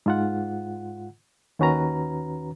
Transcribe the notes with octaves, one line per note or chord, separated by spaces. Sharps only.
G#2 F4 F#5
D#2 D#3 C#4 F#4 B4 A#5